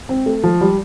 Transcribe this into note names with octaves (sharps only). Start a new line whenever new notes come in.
C4
A3
F3
G3